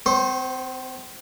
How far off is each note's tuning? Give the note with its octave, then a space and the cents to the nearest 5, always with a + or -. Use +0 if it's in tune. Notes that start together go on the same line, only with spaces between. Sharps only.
C4 -40 C5 +0 C#6 -40